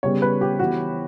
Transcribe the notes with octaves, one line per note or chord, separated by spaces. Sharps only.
C#3 G3 B3 C#5
B4
G4
E3 B3 E4 F#4